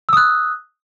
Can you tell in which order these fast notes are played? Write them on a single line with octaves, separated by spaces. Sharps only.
E6 D#6 F#6